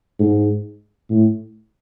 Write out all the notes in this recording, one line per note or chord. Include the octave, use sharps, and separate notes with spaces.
G#2
A2